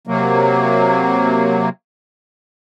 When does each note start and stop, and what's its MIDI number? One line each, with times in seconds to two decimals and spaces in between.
0.07 1.69 48
0.07 1.69 54
0.07 1.69 58